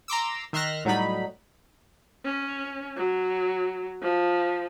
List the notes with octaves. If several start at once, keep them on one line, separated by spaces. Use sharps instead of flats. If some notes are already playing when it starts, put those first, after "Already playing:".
A#5 C6 D6 E6
D#3 E5 C6 F6 F#6 A#6
A2 F#3 G3 D#4 B5
C#4
F#3
F3